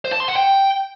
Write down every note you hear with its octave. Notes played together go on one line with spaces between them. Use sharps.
C5
A5
C6
F#5
G5